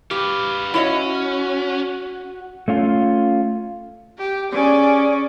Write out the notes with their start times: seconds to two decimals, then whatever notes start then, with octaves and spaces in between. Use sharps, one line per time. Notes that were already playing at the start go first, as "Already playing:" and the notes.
0.11 G4 B4 F5
0.74 C#4 E4 F#4 C#5 D#5
2.68 A3 C#4 F4
4.18 G4
4.52 C#4 G#4 D5